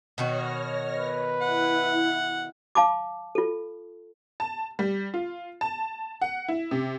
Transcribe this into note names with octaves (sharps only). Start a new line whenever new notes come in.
B2 D#3 F#4 C#5 F6 A#6
B4
E4 F#5
F5 A5 B5 D6
F4 A4
A5
G3
F4
A5
F#5
E4
C3